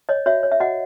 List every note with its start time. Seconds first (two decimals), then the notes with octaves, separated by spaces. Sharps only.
0.09 C#5 D#5
0.26 F#4 C#5 E5
0.43 C#5
0.52 E5
0.60 F#4 D#5 F#5